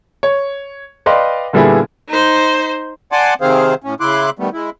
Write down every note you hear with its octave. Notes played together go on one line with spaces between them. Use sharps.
C#5
B4 D5 D#5 F5 G5 C6
A#2 D3 G3 B3 E4 G#4
D#4 C5
D5 F#5 G#5 A5 C6 D6
C3 D#3 C4 G#4 C5 F5
A2 C#4
C#3 E4 C6 D6 F#6
D#3 G3 A3 B3
G#3 E4